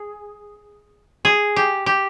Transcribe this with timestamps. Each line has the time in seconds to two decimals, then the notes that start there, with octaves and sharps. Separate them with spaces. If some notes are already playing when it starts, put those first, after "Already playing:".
Already playing: G#4
1.25 G#4
1.56 G4
1.86 G4